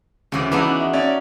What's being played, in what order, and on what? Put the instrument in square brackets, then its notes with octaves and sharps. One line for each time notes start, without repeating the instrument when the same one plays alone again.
[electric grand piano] D2 [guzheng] C#3 E3 D5
[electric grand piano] E3 B3 G#4 [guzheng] D4 D#4 F#4 [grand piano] B5 E6
[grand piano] E5
[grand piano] C#4 E5 [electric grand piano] D5